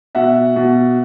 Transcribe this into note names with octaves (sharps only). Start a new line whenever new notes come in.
B2 E5 F#5
B2